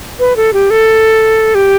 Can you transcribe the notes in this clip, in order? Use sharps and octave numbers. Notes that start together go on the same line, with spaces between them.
B4
A4
G4
A4
G4